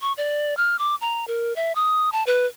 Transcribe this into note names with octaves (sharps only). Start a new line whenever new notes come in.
C#6
D5
F6
D6
A#5
A#4
E5
D#6
A5
B4